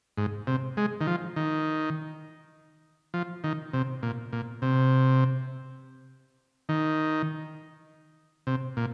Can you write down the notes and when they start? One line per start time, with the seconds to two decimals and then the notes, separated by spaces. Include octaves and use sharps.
0.17 G#2
0.47 C3
0.77 G#3
1.01 D#3
1.07 F3
1.36 D#3
3.14 F3
3.44 D#3
3.73 C3
4.03 A#2
4.33 A#2
4.62 C3
6.69 D#3
8.47 C3
8.77 A#2